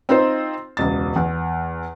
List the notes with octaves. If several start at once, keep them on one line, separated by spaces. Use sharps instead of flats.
C4 D#4 F4 C5
E1 C#2 A6
E2